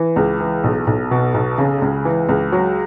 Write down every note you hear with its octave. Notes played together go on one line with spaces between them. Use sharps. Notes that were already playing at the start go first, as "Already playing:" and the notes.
Already playing: E3
C#2
E3
B1
B1
B2
B1
C#3
C#2
E3
C#2
F#3